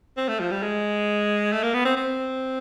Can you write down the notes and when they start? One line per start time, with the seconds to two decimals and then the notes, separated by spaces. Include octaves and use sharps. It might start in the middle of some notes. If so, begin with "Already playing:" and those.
0.17 C4
0.28 A3
0.40 F3
0.51 G3
0.63 G#3
1.52 A3
1.63 A#3
1.74 B3
1.85 C4
1.97 C4